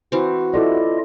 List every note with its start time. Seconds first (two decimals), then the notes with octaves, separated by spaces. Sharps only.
0.12 E3 C4 F#4
0.54 E4 F4 A4 D5 D#5